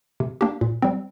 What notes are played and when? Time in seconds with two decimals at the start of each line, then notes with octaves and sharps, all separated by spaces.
0.20 C3
0.41 A#3 D4 G4
0.61 A#2
0.82 G3 C4